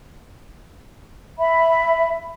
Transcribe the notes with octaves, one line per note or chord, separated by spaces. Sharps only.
E5 B5